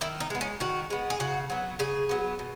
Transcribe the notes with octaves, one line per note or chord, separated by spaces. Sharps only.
D#3 E4
D#4
G#3 B3
C#4
D#3 F#4
G#3 B3
G#4
C#3 F#4
F#3 B3
C#3 G#4
F#3 B3
B2